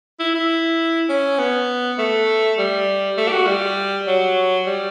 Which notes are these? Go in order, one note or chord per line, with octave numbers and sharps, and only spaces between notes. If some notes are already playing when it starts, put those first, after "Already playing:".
E4
E4
C#4
B3
A3
G3
A3
G4
F#4
G3
F#3
G3